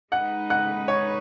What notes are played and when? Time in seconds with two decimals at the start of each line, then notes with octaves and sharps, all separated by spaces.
0.12 G#3 D#4 B4 D#5 F#5 F#6
0.50 F#5 F#6
0.88 C#5 C#6